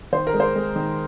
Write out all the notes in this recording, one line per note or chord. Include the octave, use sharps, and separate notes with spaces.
D#3 C5
A#4
G#3
C5
G#3
D#3